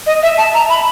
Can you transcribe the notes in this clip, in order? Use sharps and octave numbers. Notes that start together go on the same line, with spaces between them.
D#5
E5
A5
A#5
B5